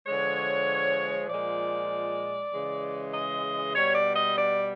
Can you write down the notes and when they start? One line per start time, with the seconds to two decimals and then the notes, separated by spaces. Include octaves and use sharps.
0.07 D3 F3 G#3 C#5
1.29 A#2 F3 G#3 D5
2.52 C#3 E3 G#3
3.14 D#5
3.75 B2 G3 C#5
3.95 D5
4.15 D#5
4.37 D5